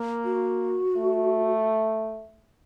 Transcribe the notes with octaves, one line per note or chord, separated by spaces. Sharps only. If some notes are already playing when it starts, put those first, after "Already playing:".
Already playing: A#3
F#4
A3